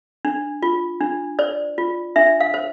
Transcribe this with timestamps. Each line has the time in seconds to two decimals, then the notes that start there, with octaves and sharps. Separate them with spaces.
0.25 D4
0.62 F4
1.01 D4
1.39 C5 D5
1.78 F4
2.16 D4 E5
2.41 F5
2.54 C5